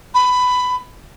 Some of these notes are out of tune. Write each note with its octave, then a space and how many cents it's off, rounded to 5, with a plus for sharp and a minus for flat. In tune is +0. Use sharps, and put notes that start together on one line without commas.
B5 +15